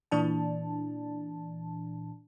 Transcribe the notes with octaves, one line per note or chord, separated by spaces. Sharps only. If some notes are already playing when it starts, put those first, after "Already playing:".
A#2 E3 D4 A5